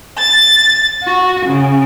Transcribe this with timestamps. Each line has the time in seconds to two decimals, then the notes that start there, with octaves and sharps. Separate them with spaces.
0.18 A6
1.03 F#4
1.47 C#3